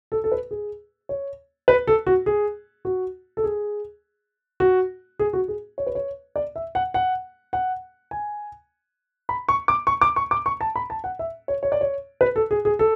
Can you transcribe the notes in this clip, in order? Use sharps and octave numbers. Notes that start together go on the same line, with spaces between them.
A4
A4
B4
G#4
C#5
B4
A4
F#4
G#4
F#4
A4
G#4
F#4
G#4
F#4
G#4
C#5
B4
C#5
D5
E5
F#5
F#5
F#5
G#5
B5
C#6
D6
C#6
D6
C#6
D6
C#6
A5
B5
A5
F#5
E5
C#5
C#5
D5
C#5
B4
A4
G#4
G#4
A4